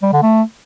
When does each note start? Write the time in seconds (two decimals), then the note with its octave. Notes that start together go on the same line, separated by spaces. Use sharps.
0.03 G3
0.13 D3
0.23 A3